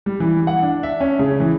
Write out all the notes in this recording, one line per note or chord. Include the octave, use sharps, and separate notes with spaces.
G3
E3
F#5
D4
E5
C#4
C#3
E3